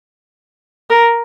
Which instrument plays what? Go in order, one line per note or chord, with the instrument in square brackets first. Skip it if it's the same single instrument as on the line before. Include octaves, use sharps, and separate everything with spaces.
[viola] A#4